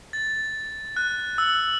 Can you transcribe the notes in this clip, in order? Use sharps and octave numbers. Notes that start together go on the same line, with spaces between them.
A6
F#6
E6